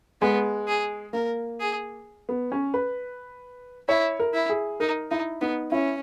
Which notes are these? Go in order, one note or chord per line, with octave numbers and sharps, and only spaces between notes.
G#3 B3
G#4
A#3 A#4
G#4
B3
C#4
B4
E4 C#5
A#4
E4
G#4
D#4 A#4
D#4 E4
B3 D#4
C#4 E4